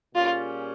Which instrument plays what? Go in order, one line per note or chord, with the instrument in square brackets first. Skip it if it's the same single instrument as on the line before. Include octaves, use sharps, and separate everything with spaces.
[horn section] A#2 G3 C#4 G#4 [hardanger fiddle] F4